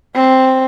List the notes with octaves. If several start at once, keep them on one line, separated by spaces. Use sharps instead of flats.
C4